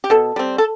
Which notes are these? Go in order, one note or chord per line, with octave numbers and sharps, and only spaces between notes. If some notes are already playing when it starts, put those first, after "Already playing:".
G4
B2 A4
G3 C4
A4